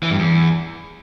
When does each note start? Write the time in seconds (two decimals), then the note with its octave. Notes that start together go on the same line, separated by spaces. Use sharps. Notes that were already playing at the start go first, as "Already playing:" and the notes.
0.03 E3
0.11 G2
0.19 E2